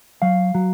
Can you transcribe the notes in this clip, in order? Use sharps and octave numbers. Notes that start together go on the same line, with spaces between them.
F#3 F5
F#3